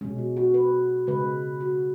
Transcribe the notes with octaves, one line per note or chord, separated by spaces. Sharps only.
B2 G#3 C#4
F#4
F#4
B4
C#3 G#3 B4
F#4